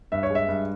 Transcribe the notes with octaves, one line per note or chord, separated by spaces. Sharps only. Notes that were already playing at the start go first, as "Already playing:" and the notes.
G2 E5
C#5
G#3
E5
G2